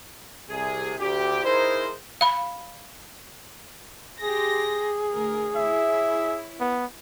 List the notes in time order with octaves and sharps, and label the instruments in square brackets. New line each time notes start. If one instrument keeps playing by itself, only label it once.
[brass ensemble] C2 C3 G#4
D2 G4
D#4 E4 G#4 A#4 C5
[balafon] F5 B5
[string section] G4 C6 A#6 [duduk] G#4
[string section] D2 A#4
[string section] E4 C#5 [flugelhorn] E5
[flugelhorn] B3